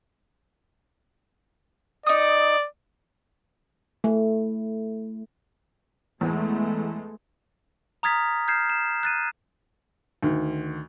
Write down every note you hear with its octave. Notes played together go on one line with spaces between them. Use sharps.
D#4 D5 D#6
A3
E2 G#3 A3 B3
A#5 D#6 F6 G#6 A6 B6
F6 G6 G#6 C7 E7
E7
F#6 A6 D#7
D2 D#3